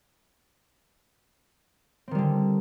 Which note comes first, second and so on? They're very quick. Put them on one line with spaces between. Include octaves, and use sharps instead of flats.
C4 D#3 G3 D3